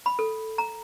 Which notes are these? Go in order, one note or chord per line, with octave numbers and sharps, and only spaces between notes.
B5
A4
A#5